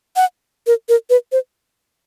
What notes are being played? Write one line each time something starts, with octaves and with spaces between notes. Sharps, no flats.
F#5
A#4
A#4
B4
C5